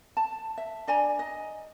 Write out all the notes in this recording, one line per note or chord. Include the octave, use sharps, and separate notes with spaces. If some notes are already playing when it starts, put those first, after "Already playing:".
A5
E5
D4 D5 G#5 A#5
D#5